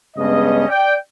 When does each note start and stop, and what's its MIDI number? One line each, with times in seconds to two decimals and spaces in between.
0.17 0.67 43
0.17 0.67 49
0.17 0.67 56
0.17 0.67 59
0.17 0.67 61
0.17 0.67 75
0.69 0.95 74
0.69 0.95 79